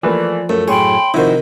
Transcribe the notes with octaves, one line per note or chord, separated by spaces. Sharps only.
E3 F3 A3 A#3 B4 D5
F#2 A3
F#2 A2 G#4 C#5 G5 B5 C6
C3 D#3 F3 D#4 E4 F#4 C5